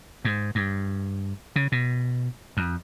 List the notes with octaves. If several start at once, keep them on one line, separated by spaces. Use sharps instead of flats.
G#2
G2
C#3
B2
F2